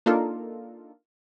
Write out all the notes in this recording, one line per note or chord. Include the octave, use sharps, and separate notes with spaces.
A#3 D4 D#4 F4 A4 A#4